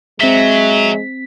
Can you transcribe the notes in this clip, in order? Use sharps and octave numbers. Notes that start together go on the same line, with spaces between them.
F#3 G#3 C4 E5 B6